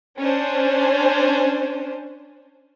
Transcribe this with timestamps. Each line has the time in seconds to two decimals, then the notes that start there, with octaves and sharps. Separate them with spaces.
0.18 C#4 D4 C5